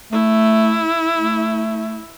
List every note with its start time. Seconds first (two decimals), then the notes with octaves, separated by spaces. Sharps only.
0.12 A3 E4
1.18 A3